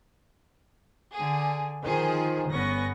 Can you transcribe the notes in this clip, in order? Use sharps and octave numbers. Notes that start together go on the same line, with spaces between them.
D3 G#4
D#3 F3 G#4 C5
G1 B3 C#4 C#6 A#6